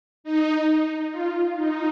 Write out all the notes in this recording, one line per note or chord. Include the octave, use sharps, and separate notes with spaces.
D#4
F4
D#4